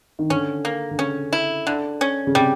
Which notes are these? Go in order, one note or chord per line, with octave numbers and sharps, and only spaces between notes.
D#3
D3 C#4
A#3
D3
C#3 C#4
E4
D3
C#4
C#3
C3 G3